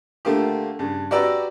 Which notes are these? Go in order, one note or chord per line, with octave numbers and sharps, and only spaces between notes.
D3 A3 A#3 F4 G4
G2 C#3
F#4 G4 B4 D5 A#5 E6